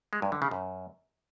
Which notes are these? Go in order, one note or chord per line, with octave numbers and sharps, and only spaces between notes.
G#3
G2
D3
C#3
F#2